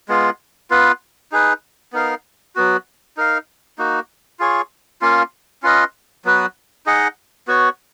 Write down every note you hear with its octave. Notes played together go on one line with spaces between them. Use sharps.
G#3 B3 F4
B3 F4 B4
D#4 G#4 B4
B3 D#4 A#4 F5
F#3 B3 F#4
D#4 A#4 F5
A#3 D#4 F#4
F4 G#4 C#5
A#3 C#4 F4
C#4 F4 B4 D#5
F#3 B3 F#4 B4
D#4 G#4 D#5 F#5
B3 F#4 C#5